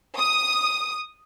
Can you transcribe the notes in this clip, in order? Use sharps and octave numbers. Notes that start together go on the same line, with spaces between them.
D#6